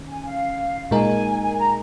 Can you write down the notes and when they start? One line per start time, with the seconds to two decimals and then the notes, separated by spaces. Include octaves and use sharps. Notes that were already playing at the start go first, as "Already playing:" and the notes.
Already playing: D#3 C#4
0.09 G#5
0.25 F5
0.91 A#2 G#3 D#4 A#4 G#5
1.41 G#5
1.58 A#5